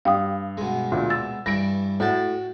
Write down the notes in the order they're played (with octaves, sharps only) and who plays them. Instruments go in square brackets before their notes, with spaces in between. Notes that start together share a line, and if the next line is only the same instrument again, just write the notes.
[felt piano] G2 [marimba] F5 G5 D#6
[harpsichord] B2 G#3
[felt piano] D2 A#2
[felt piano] E6 [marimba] A6
[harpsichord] G2 E3 E5 [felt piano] A#6 D7
[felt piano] A2 [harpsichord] F#4 G5 A5